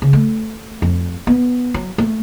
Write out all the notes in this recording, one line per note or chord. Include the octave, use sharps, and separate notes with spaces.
C#3
A3
F2
B3
F#3
A3